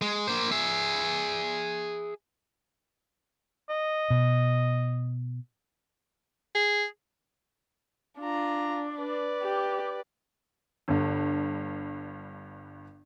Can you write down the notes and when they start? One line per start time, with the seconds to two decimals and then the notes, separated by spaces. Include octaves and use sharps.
0.02 G#3
0.27 A#3 C5
0.52 G#4 E5
3.70 D#5
4.10 B2
6.55 G#4
8.21 D4 F4 A#5
8.94 B4 D5
9.43 G4
10.88 G1 G2